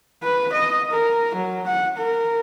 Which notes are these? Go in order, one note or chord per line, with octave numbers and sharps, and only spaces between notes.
B4
D#5
A#4
F#3
F#5
A#4